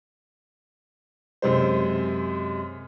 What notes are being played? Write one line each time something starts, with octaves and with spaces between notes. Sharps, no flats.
F#2 C3 G#3 C5